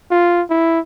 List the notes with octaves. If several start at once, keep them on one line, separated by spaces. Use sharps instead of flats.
F4
E4